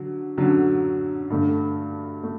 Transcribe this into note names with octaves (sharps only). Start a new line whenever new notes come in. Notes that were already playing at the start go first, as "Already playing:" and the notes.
Already playing: D3 F#3
F#2 D3 F#3
G2 D3 A3
A3